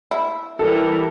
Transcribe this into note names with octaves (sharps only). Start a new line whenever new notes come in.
E4
E3 G3 A4 A#4